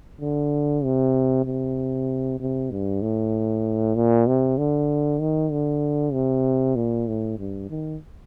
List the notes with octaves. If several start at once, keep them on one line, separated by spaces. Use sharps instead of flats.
D3
C3
C3
C3
G2
A2
A#2
C3
D3
D#3
D3
C3
A#2
A2
G2
D#3